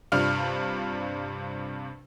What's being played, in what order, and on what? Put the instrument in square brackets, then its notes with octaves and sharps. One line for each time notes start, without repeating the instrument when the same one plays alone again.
[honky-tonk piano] G2 C3 D4 F4 F6